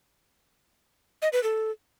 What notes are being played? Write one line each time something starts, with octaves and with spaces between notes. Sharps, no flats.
D#5
B4
A4